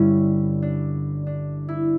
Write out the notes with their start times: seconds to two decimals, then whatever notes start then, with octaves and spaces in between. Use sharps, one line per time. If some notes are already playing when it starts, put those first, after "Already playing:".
Already playing: G1 G2 D3 G3 C#4 E4
0.62 D4
1.27 D4
1.68 E4